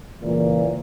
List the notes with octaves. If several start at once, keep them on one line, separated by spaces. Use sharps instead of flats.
C#2 A#2 E3